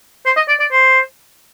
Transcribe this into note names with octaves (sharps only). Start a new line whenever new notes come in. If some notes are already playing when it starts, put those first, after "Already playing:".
C5
D#5
D5
D5
C5